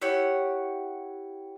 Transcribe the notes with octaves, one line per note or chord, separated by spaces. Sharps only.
E4 G4 C#5 F#5